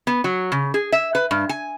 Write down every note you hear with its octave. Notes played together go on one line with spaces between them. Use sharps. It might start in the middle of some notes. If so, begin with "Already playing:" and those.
B3
F#3
C#3
G#4
E5
B4
G2
G#5